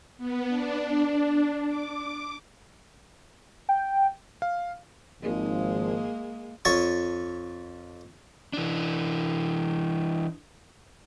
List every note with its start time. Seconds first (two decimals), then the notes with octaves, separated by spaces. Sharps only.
0.18 B3
0.49 D4
1.67 D6
3.69 G5
4.42 F5
5.22 G#1 F3 G#3 A#3
6.65 F2 C#5 A5 C#6
8.53 E3 D4